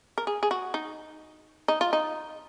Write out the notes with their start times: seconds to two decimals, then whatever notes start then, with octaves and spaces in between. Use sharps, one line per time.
0.18 A#4
0.27 G#4
0.43 G#4
0.51 F#4
0.74 D#4
1.68 D#4
1.81 F4
1.93 D#4